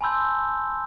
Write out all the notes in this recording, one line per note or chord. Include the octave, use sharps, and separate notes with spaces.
G#5 A5 B5 C6 E6 G6